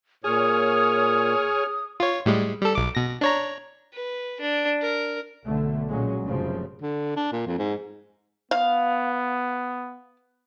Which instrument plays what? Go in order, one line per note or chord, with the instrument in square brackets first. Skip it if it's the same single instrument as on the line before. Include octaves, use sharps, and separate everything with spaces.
[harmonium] A#2 [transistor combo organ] G#4 [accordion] C#5 F6 [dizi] D#6
[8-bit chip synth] F4 C#5
A2 G3 G#3
G3 A4
B1 D6
B2 A#6
D4 C#5 A#5
[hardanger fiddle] B4
D4
A#4
[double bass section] B1 D3 A3
A#2 F#3 G#3 C#4
F1 F#2 C#3 F3
[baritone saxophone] D3
D4
A#2
F2
G#2
[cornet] B3 [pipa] F5